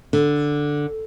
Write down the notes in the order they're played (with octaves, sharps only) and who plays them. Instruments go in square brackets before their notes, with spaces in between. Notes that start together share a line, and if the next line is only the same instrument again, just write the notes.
[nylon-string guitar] D3